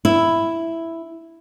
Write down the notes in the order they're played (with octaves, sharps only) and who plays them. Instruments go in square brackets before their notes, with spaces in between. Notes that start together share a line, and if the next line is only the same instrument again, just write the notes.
[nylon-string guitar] E4